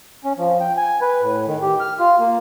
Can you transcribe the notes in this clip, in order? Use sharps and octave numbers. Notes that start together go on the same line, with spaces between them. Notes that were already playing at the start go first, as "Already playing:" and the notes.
C#4
F3
G5
G#5
B4
A2
D#3
G4
F6
F4
A#3